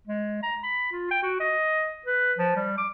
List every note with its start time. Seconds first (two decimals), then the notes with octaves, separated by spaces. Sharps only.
0.08 G#3
0.43 A#5
0.63 B5
0.92 F4
1.11 G5
1.23 F#4
1.40 D#5
2.06 B4
2.38 F3
2.56 G3
2.78 D6